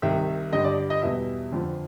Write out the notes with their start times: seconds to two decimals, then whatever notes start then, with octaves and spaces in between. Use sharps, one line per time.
0.02 C2 C3 D#3 G3 E5
0.52 G2 D3 G3 D#5
0.64 D5
0.90 D#5
1.02 E2 B2 G3 E5
1.52 F2 D3 F3